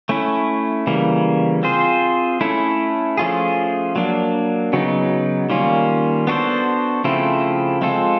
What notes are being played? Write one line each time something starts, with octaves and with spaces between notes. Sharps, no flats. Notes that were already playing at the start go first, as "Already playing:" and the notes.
A3 C#4 E4
C#3 E3 G3 A#3
C4 F4 G#4 C5
A3 C#4 E4 A4
F3 A3 C#4 F4 G#4
F#3 A#3 D4
C#3 F#3 B3 D#4
D#3 G3 A#3 C#4 F4
B3 D4 F#4 A4 C5
C#3 F3 A3 C4 E4
G#3 C4 F4 A4